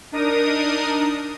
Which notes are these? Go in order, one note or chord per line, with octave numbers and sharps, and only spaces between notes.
D4 D#4 A#4 D#6